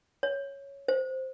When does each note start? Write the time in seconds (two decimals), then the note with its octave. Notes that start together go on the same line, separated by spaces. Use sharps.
0.23 C#5
0.88 C5